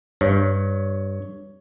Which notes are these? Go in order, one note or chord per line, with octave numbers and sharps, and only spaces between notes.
G2 C#5